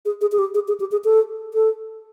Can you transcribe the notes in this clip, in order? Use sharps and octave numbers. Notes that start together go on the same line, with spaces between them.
G#4
G#4
G#4
G4
G#4
G#4
G4
G#4
A4
A4